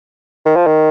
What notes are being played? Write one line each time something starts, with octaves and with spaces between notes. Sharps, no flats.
D#3
F3
D#3